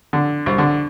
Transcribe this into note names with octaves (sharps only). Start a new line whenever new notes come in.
D3
C2
D3